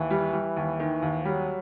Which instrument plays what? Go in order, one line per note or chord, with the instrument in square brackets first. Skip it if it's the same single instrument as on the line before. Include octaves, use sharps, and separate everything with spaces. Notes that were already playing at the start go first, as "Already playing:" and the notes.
Already playing: [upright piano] D#2 [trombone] E3
[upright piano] G3
G3
D#2
D#3
D#2
[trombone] F#3 [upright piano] G3